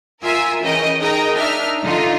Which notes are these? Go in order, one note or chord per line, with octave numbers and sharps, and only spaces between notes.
F4 A#4 E5 G#5 E6
C#3 E3 A#4 D#5 G5
D#4 G#4 A#4 D#5 G5 A#5
D4 D#4 E5 F6
D3 D#4 F4